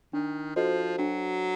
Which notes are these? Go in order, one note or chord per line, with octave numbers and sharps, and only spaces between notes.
D#3 D4
F3 F#4 A4 C5 D#5
F#3 D4